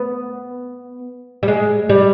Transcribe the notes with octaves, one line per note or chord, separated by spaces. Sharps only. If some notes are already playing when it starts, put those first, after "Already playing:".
Already playing: B3
G3
G#3
G3